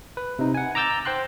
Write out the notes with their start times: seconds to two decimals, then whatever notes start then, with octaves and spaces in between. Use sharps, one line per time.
0.17 B4
0.39 C3 D#4
0.55 F#5 G#5
0.75 A#5 D6 E6 G6 A6
1.05 C5 G5 C6 F#6